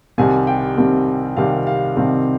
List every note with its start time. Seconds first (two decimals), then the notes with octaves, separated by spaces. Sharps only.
0.18 C2 C3 D#3 G3 C4 G#5
0.47 G5
0.77 C2 C3 D#3 G3 C4
1.37 C2 C3 D#3 G3 C4 F5
1.67 F5
1.96 C2 C3 D#3 G3 C4